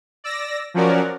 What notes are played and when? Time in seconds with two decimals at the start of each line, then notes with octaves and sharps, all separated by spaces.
0.24 D5 E6 A#6
0.74 F3 F#3 C#4 F#4 A#4 D5